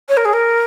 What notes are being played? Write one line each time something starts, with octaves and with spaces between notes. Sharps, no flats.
C#5
A#4
G#4
A#4